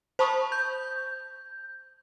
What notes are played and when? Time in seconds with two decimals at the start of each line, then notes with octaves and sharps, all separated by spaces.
0.19 C5 A5 B5 C#6 D#6
0.52 G6